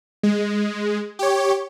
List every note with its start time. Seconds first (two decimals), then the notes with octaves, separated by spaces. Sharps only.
0.23 G#3
1.19 G4 C#5